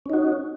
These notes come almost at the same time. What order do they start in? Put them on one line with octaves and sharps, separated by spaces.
C#4 D#4 F#4